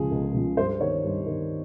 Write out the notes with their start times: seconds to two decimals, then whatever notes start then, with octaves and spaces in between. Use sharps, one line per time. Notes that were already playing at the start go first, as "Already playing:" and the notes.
Already playing: C#2 C#3 F3 G#4
0.11 C#2
0.34 C#3 F3
0.57 G2 C5
0.81 D#3 C#5
1.04 G2
1.26 D#3